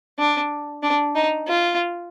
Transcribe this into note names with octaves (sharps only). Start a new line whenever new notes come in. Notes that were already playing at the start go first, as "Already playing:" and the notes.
D4
D4
D#4
F4